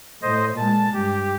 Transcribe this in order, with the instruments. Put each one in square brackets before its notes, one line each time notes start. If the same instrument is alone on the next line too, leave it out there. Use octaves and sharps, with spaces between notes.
[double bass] A2 [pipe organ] C5 D#5
[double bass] A#2 G#3 [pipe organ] A5
[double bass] G2 [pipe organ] G4